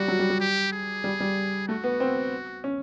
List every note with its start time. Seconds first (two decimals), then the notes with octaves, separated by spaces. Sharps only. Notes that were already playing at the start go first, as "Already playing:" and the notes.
Already playing: G3 F#4
0.08 F#3
0.19 G3
0.30 G3
0.41 G4
0.73 G#4
1.04 G3
1.20 G3
1.68 A3 F#4
1.84 B3
2.00 C4
2.64 C#4